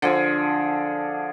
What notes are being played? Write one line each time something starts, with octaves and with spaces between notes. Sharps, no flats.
D3 F3 G#4